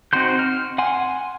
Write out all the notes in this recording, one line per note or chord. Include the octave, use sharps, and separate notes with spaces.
C4 D#4 F#4 C6 G6
F6
F#5 G#5 C6